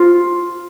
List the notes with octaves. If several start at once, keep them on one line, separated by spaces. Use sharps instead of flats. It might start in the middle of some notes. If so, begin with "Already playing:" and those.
Already playing: F4